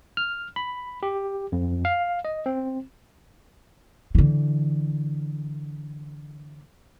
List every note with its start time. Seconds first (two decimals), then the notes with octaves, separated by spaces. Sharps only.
0.17 F6
0.56 B5
1.03 G4
1.52 F2
1.85 F5
2.25 D#5
2.46 C4
4.15 D3 E3